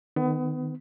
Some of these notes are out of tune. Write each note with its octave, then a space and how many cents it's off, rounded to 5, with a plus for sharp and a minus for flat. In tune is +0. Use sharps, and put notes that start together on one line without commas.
D#3 -15 B3 +30